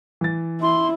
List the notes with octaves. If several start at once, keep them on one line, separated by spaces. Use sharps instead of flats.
E3 A6
E4 C6